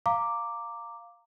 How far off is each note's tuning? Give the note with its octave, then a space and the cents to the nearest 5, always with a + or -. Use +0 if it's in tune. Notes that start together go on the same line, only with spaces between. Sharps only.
F5 +0 A#5 -15 D6 +0